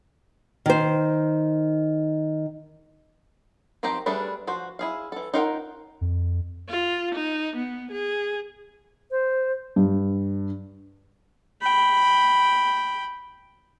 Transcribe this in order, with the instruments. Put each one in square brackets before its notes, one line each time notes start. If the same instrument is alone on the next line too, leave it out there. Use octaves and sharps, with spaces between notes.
[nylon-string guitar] D#3 C5
[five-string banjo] D#3 F3 C4 G4 A#5
G3 A3 D4 G#4 B4
F3 F#4 C5
E4 G#4 F5
E3 A4
D#4 F4 A#4 F#5 G5
[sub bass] F2
[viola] F4
D#4
B3
G#4
[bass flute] C5
[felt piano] G2
[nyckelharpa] G5 B5